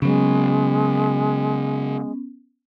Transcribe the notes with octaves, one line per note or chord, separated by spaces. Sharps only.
C#3 F#3 G#3 B3 C#4